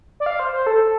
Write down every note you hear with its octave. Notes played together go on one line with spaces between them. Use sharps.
D5
F5
C5
C5
A4